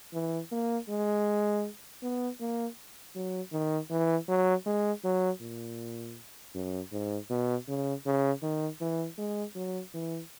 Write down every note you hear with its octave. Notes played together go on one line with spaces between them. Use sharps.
E3
A#3
G#3
B3
A#3
F#3
D#3
E3
F#3
G#3
F#3
A#2
F#2
G#2
B2
C#3
C#3
D#3
E3
G#3
F#3
E3